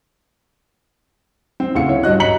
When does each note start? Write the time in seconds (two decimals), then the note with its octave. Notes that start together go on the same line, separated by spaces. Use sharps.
1.60 C4
1.75 D2 C#3 E4 F5 C#7
1.89 C#5
2.03 G2 F#4 D#5 F#6
2.20 A#5 B6 C#7 F#7